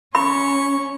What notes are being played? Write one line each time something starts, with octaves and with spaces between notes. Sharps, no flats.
C#4 B5 C#6